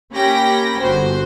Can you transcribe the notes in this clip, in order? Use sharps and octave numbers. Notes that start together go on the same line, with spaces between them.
A#3 C#4 G4 G5 B5 A#6
G1 F#4 C5